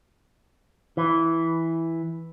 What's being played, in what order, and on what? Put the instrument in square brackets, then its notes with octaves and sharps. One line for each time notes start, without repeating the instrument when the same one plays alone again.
[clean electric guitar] E3